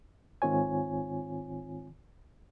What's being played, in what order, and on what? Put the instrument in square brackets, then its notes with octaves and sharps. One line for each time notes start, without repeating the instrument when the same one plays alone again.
[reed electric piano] G#2 D#3 C4 F4 C#5 G#5